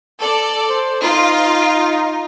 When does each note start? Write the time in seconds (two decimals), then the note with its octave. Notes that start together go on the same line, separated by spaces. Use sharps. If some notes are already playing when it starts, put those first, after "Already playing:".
0.19 A4 D5
0.69 C5
1.03 D#4 F4